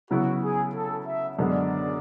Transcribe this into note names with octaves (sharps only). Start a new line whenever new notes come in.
C#3 F#3 B3 E4 F#4
G#4
A4
E5
F#2 D3 G#3 B3 D5